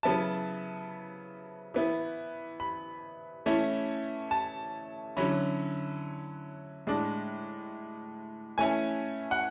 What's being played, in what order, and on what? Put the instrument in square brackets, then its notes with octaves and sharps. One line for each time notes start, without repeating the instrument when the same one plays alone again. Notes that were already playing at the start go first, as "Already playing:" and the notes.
[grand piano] C#3 F#3 B3 E4 A5
E3 B3 E4
B5
E3 A3 C#4 E4
A5
D3 F#3 C#4 E4 B5
A2 G#3 D4
E3 A3 C#4 E4 G#5
F#5